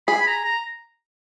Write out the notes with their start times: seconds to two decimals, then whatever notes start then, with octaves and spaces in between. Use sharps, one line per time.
0.08 G#4 B5
0.21 B5
0.27 A#5
0.45 A#5